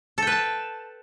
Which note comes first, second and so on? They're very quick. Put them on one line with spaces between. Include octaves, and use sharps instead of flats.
A4 G5 B4 A5